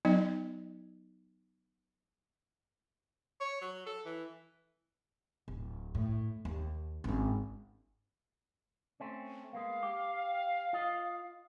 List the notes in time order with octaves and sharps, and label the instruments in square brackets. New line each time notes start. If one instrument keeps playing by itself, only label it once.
[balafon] F#3 B3 D#4 D#5
[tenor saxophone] C#5
F#3
A4
E3
[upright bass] D1
A2
D#2
G#1 C#4
[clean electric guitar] A3 C4 C#4
[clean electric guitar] G#3 A#3 B3 [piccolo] F5
[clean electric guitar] G4
F4 D#5